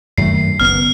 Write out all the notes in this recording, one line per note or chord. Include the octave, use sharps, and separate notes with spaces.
F#2 D#3 A3 C7
F#1 B3 F6